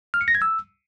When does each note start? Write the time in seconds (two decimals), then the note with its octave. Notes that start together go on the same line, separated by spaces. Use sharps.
0.14 F6
0.21 C#7
0.28 A#6
0.35 G#6
0.42 E6